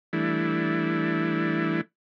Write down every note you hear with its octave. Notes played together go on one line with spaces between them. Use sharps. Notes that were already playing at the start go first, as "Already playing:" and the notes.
E3 G3 A3 D4 E4